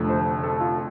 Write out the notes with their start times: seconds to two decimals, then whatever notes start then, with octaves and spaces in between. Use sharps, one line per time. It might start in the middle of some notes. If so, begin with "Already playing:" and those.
Already playing: F1 F2 D3 F3 A3
0.09 C5
0.43 A4
0.61 F4